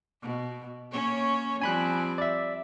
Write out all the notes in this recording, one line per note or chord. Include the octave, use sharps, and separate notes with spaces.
B2
A#3 C#4 C#5
F3 G3 C4 G#5 B5 F#6
D5 E5